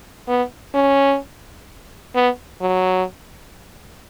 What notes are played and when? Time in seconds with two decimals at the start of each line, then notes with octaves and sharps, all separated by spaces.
0.28 B3
0.75 C#4
2.15 B3
2.61 F#3